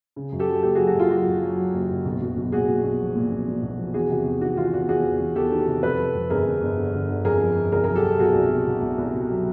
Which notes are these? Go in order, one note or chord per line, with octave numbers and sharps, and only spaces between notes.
C#3
F#2
G4 A4
F#3
F#1 G4 A4
F#3 F#4 G#4
F#4
F#2
F4
F#3 F#4
F#2
F#3
F#3
F#1
F#1
B1
B1
B1
A#2 F#4 G#4
A#2
B1
F3
A#2
B1
A#2
B1
F3
E2 F#4 G#4
C3
E2
D#3 F#4
E2 F4
E2 F#4
E2 F#4 G#4
E2
E2
E2 G4 A4
D#3
C3
F2 A4 B4
F3
F2
G1 G#4 A#4
G1
G1
D3
G1
D3
F2 G#4 A#4
F3
G1
C2 G#4 A#4
F#3 G#4 A#4
G4 A4
F#3
B2 F#4 G#4
C2
B2
B2
C2
C2
B2
F#3